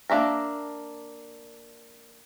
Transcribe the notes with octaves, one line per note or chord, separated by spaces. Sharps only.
A#3 D4 E5 A#5